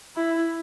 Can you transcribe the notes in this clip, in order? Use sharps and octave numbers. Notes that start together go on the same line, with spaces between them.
E4